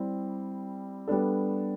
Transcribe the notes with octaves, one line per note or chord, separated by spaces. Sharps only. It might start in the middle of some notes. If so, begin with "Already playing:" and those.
Already playing: G3 C4 E4
G3 B3 D4 A4